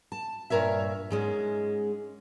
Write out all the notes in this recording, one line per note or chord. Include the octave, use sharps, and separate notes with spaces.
A5
G2 A#2 A#4 C#5 E5
G#2 G#3 C#4